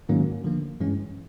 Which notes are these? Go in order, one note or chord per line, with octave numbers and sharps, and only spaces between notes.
G#2 D#3 F#3 A#3 C#4
D3 F3 A#3
G2 E3 G#3 C#4